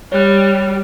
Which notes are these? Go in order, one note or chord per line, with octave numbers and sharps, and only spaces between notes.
G3 C#5 F#6